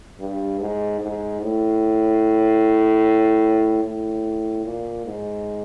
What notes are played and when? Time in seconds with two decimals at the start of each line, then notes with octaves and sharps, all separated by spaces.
0.20 G2
0.60 G#2
1.01 G#2
1.42 A2
3.85 A2
4.65 A#2
5.06 G#2